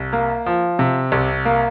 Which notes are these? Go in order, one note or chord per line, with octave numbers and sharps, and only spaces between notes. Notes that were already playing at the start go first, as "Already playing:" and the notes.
Already playing: C2
A#3
F3
C3
C2
A#3